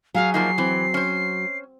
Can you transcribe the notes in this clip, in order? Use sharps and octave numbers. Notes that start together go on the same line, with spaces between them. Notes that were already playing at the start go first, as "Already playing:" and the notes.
F#3 F#4 G#4 F5 G#5
F3 A#3 D#4 C7
E3 C4
C#4 C5